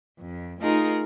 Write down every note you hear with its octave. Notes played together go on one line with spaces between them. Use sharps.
F2
A3 D#4 F4 G#4 A#4